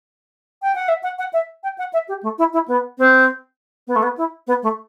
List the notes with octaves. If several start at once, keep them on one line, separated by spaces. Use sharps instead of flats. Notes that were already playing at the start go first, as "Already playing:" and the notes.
G5
F#5
E5
F#5
F#5
E5
G5
F#5
E5
G4
A3
E4
E4
B3
C4
B3
A3
B3
E4
B3
A3